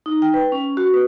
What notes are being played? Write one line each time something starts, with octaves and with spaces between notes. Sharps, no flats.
D#4
G5
B4
C#4
F#4
B4